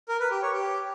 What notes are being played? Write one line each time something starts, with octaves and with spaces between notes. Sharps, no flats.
A#4
B4
G4
C#5
G4